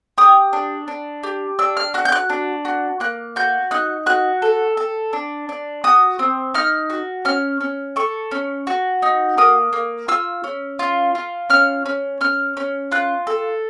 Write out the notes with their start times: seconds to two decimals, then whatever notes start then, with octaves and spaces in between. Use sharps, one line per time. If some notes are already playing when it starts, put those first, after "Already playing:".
0.18 G4 D#6
0.53 D4
0.88 D4
1.23 G4
1.59 D4 E6
1.77 F6
1.94 F#4 F#6
2.05 G6
2.12 F#6
2.30 D4
2.65 F#4
3.00 A#3 F#6
3.36 F#4 G6
3.71 D#4 F#6
4.06 F#4 F#6
4.42 A4
4.77 A4
5.13 D4
5.49 D4
5.84 F#4 D#6
6.19 C4
6.54 D#4 F6
6.90 F#4
7.25 C#4 F6
7.61 C#4
7.96 A4 C#6
8.31 C#4
8.67 F#4
9.02 D#4
9.38 A#3 D#6
9.73 A#3
10.08 F4 E6
10.44 C#4
10.79 F4
11.15 F4
11.50 C#4 F6
11.86 C#4
12.21 C#4 F6
12.57 C#4
12.92 F4 F#6
13.27 A4